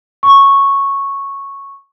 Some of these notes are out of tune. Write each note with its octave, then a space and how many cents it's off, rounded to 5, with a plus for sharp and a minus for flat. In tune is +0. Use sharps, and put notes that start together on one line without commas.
C#6 -5